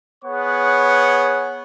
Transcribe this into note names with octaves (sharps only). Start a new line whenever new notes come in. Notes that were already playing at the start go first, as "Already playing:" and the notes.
B3 G#4 C#5 F#5 C#6